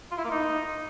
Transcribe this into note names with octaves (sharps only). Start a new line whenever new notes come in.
F4
E4
A#3
D#4